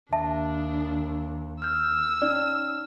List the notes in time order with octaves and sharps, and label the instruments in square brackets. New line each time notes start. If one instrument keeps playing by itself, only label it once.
[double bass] D#2 [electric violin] D4 [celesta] E5 A5
[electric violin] E6 [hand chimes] F6 G6
[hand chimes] C#4 D#4 F6 [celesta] D5